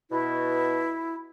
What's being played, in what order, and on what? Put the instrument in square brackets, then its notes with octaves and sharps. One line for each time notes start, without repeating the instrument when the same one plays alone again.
[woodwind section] B2 [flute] E4